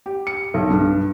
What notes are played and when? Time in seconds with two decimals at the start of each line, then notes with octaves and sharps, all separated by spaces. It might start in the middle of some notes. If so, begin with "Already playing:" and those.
0.06 G4
0.27 C#7
0.54 B1
0.70 G2